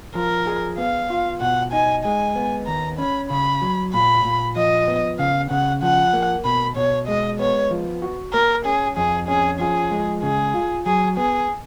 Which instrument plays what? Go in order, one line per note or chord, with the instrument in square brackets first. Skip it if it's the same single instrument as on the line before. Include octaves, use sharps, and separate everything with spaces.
[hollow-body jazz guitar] F3 [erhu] A#4
[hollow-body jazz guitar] G#4
[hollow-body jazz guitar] B3 [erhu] F5
[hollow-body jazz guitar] F4
[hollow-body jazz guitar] B2 [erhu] F#5
[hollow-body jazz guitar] D#4 [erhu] G#5
[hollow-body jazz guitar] G#3 [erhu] G#5
[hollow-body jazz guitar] B3
[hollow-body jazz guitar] D#2 [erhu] A#5
[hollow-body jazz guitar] C#4 [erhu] B5
[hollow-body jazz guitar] C#3 [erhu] B5
[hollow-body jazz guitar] F#3
[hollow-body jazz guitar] A#2 [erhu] B5
[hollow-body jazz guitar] A#2
[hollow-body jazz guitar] F3 [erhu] D#5
[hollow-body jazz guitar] B3
[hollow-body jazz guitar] C#3 [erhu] F5
[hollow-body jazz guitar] C#3 [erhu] F#5
[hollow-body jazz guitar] F3 [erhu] F#5
[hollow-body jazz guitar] A#3
[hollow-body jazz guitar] B2 [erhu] B5
[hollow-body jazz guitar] B2 [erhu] C#5
[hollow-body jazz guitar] G#3 [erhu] D#5
[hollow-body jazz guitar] B3 [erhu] C#5
[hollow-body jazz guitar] F3
F#4
[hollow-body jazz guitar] A#3 [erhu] A#4
[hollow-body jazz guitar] C#4 [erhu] G#4
[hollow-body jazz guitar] F2 [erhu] G#4
[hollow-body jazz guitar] C#4 [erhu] G#4
[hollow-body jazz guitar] F3 [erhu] G#4
[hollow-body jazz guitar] G#3
[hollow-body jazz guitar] C#3 [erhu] G#4
[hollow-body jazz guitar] F4
[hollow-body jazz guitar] F#3 [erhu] G#4
[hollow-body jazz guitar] B3 [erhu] G#4